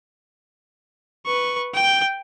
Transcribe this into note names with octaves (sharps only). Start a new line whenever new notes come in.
B4 C#6
G5 G6